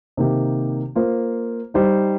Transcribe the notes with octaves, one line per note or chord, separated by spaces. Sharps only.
C3 D#3 A#3 G4
A#3 F4 C5
G3 D#4 G4 C5